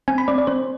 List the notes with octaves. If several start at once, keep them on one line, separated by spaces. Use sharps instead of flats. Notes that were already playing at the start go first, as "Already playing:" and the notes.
C4 G#5
B5
C4 D5
D5
C4 C5